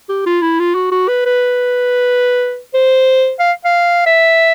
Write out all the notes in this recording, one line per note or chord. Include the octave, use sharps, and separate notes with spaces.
G4
F4
E4
F4
F#4
F#4
B4
B4
C5
F5
F5
E5